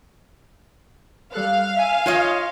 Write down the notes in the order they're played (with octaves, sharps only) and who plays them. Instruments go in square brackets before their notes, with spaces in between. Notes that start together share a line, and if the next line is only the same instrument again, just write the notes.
[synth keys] G3 A4 F#6 [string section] F5
[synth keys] E5 G#5
[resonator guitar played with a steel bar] F4 C#5 D#5